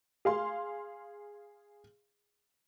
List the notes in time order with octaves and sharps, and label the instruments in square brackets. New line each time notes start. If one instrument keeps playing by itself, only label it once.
[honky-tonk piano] G#4 F5 C6